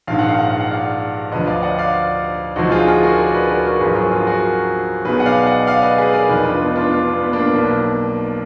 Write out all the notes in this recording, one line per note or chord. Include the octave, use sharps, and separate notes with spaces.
A#1 G#2 D#3 F5
F#5
F5
F#5
F5
F#5
D5 F5
D2 D3 F3 B4 D#5
D5 F5
D#5 F#5
D5 F5
D2 D3 F3 D#4 F#4
F4 G#4
F4 G#4
F#4 A#4
A#4 D5
G#4 B4
F#4 A#4
G#4
F#4 A#4
G#1 F#2 F3 G#4 B4
F#4 A#4
F4 G#4
F#4 A#4
B1 B2 G#4 B4
F#5
D5 F5
D#5 F#5
D5 F5
B4 D#5
G#4 B4
A#4 D5
F1 F2 D#3 B4 D#5
D4 F4
B3 D#4
D4 F4
D4 F4
B3
B3
A#3 D4
B1 B2